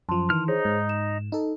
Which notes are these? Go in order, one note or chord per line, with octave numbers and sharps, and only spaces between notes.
F#2 F3 A5 C6
D#3 E3 F6
D#4 G#4 C5 C#5
G#2
E7
D#4 A4